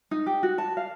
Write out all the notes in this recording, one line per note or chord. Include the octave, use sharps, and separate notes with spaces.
D#4
G4
F#4
A5
F5